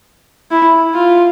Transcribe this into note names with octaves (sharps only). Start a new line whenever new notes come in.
E4
F4